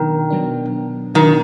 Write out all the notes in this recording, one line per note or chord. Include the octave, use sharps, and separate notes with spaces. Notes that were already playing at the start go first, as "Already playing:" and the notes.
Already playing: B2 D#3 F#3 B3 D4
B2 F#3 B3 D4
B2 D#3 F#3 B3 D4